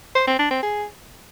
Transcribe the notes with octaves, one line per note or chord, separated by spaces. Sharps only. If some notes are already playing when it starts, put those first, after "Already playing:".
C5
C4
D4
C4
G#4